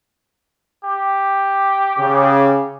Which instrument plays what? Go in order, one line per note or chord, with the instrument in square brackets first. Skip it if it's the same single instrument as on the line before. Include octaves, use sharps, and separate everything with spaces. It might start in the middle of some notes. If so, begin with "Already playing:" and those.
[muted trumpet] G4
[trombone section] C#3